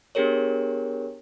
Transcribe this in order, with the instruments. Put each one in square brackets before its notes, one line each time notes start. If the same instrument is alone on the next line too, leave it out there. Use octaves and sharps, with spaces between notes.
[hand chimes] B3 D4 G4 G#4 A#4 C#5